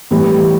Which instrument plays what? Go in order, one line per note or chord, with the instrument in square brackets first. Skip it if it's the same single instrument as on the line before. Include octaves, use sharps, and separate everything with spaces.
[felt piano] A2 E3 G3